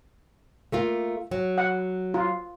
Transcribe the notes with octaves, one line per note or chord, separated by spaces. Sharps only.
A3 A#3 F4
F#3
F#5
F4